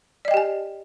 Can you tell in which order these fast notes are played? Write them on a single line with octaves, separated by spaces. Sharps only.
D5 D#5 G5 G4 G#5